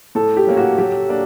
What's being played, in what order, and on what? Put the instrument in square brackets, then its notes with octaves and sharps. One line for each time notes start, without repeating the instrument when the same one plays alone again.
[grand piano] A2 [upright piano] A4
[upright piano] G4
[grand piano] F#3 A#3 C#4
[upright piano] F#4
[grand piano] F#3 [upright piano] G4
[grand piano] A#3 D4